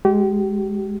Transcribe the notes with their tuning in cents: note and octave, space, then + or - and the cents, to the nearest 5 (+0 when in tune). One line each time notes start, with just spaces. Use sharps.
G#3 +0 G4 -35